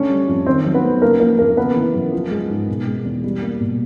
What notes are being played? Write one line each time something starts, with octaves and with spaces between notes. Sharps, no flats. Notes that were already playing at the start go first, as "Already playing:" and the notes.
Already playing: D3 A3 C#4 C#5
G3
F2
D#3 C4 C5
F#3
B3 B4
A3
C#3 A#3 A#4
F3 A#3 A#4
F2 A#3 A#4
C#3 B3 B4
E3
F#2
F3
G#3
G#2
B2
G#3
E2
G3
A#3
B2